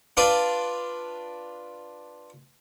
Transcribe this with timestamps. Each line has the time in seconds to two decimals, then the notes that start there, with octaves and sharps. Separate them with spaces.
0.17 D4 F4 B4 D5